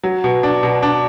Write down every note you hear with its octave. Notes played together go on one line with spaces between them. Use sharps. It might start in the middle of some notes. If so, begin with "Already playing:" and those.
F#3
B2
D4
B2
D4